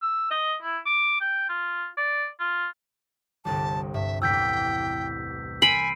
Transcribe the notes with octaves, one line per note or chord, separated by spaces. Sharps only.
E6
D#5
E4
D6
G5
F4
D5
F4
G1 C2 G3 A5
G2 E5
A1 E2 G5 E6 G6 B6
A#4 G#5 B5 C6 F6 C7 D7 D#7